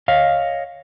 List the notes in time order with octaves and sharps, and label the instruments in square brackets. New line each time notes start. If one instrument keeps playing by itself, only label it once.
[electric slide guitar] C#5 D#5 F5